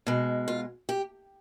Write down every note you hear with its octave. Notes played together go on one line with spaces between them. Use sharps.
B2 G#3
F4
G4